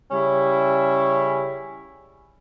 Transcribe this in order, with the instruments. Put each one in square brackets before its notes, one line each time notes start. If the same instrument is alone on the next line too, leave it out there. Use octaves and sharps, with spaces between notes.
[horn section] C#3 G3 C#4 E4